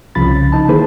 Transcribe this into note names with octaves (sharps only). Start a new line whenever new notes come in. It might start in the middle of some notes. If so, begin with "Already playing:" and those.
C2 C#3 F3 B5 A6
D#4 A5
D#3 A#3 E4 G#4 B4 C5